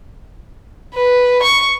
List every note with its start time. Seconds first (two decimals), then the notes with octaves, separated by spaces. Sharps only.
0.95 B4
1.42 C#6